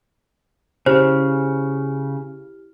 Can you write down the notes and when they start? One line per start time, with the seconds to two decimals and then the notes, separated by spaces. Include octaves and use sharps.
0.86 C#3 E4 G4 C5 F6